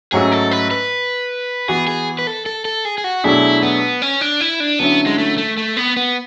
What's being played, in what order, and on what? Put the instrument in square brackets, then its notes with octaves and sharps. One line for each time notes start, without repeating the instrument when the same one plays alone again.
[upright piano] G#2 F#3 A3 C#4 F#4 [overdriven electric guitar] G#4
[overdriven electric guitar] A4
B4
B4
[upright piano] E3 B3 F#4 [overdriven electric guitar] G#4
[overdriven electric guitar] G#4
B4
A4
A4
A4
G#4
G#4
F#4
[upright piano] B2 F#3 A3 D4 G#4 [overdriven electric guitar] E4
[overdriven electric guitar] B3
C#4
D4
E4
D4
[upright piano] D3 F#3 C#4 E4 [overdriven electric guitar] B3
[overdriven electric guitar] G#3
A3
A3
A3
B3
B3